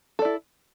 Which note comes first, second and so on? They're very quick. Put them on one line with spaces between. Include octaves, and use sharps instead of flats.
A4 D5 E4